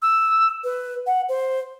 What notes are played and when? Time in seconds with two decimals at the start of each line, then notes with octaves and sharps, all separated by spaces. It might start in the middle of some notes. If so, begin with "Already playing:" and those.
0.02 E6
0.64 B4
1.07 F#5
1.29 C5